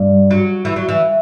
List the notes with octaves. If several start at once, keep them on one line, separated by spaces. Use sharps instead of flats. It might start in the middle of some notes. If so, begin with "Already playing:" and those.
Already playing: G2
F#3
E3
F#3
E3